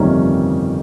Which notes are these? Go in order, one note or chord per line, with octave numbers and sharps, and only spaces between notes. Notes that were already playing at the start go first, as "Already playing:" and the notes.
Already playing: G1 F2 C3 D#3 G3 A#3 C#4